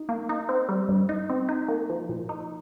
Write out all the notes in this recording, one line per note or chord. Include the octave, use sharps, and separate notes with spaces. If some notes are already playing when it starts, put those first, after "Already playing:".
Already playing: D#4
A#3
D#4
C4
G3
G2
D#4
C4
D#4
A#3
F3
A#2
D#4